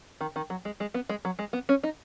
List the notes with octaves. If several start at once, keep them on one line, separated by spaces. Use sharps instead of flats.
D#3
D#3
F#3
G#3
G#3
B3
G#3
F#3
G#3
B3
C#4
D#4